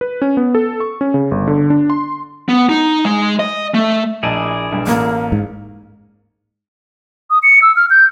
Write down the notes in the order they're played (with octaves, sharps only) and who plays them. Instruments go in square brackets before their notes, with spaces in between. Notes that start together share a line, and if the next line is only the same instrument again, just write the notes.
[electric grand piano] B4
C#4
B3
A4
C#6
C#4
C#3
G1
D3
D4
C6
[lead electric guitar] B3
D#4
G#3
D#5
A3
[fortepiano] A#1 D#5 A5 [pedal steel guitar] E4 G#4 D5
[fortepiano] B1 G2
[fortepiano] A1 [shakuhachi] A#3
[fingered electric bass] G#2
[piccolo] D#6
C#7
E6
F6
G6